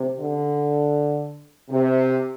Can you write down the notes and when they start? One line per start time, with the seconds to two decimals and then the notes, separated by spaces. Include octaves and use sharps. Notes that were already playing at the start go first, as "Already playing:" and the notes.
Already playing: C3
0.20 D3
1.70 C3